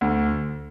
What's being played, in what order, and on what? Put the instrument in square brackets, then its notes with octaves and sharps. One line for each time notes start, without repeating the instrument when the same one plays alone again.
[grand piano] D2